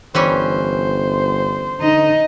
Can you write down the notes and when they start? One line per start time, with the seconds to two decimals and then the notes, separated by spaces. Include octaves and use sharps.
0.15 G1 E3 G3 C#4 C5
1.81 D3 D#4 D#5